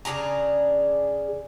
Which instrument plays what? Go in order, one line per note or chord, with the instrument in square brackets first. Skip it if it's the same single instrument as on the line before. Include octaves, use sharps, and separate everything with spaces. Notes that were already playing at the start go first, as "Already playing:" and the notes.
[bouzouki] C#3 D4 G#4 A#5